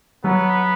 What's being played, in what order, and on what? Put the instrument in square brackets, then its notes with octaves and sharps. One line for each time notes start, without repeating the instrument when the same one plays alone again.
[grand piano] F#3 [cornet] B3